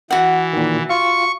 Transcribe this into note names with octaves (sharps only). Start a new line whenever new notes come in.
E3 F#4 F#5
A#2 D#3
F4 F5 C#6